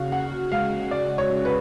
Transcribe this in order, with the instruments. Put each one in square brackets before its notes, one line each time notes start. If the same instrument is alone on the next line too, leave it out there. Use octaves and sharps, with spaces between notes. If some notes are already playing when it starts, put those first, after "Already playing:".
Already playing: [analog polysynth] C#3 F#4 [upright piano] F5
[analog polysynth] F#4 [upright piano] F#5
[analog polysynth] G#3 [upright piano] F5
[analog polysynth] G#3 [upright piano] D5
[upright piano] C#5
[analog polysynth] C#3
[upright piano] B4